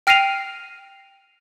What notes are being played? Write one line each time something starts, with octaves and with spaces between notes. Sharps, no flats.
G5 F6 A#6 C7 D#7 F7